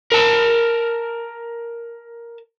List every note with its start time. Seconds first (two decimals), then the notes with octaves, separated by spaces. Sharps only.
0.12 A#4 A5